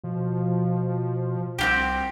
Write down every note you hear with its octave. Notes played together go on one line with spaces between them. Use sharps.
B2 F3
C2 C4 F4 G4